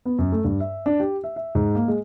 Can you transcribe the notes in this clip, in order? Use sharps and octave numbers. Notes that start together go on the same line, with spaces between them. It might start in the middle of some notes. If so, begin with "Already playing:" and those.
B3
F#2
A3
G2
E5
D4
G4
E5
E5
G#2
A#3
G#3